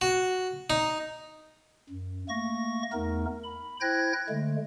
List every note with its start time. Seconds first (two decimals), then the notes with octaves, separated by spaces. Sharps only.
0.01 F#4
0.70 D#4
1.89 F#2
2.29 A3 A#3 C#6 A#6
2.93 E2 A3 B3 D#4 A#4
3.44 B5
3.81 E4 C5 G5 F#6 G#6 A#6
4.29 D3 G#3 A3